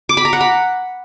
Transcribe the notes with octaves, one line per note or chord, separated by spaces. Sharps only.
D6
B5
A#5
F#5
B5